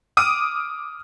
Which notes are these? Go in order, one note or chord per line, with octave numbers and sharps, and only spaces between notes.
D6 D#6 F6 D7 D#7